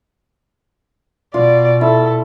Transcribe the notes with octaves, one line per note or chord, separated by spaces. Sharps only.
B2 F4 D5
E4 A4